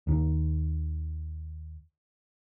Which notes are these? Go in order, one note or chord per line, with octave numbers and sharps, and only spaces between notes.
D#2 D#3